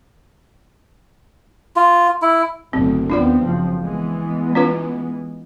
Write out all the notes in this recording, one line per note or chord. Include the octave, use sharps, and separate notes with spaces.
F4
E4
F#1 D2 B2 C4
D#2 B3 C4 D4 F4 D5
F#1 F3
E3 G#3 B3
C#4 F4 B4